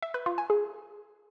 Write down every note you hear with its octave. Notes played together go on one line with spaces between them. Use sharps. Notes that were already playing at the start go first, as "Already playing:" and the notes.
E5
B4
F4
G#5
G#4